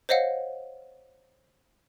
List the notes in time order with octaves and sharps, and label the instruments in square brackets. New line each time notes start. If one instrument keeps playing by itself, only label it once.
[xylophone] C5 C#5 D#5 F5 F#5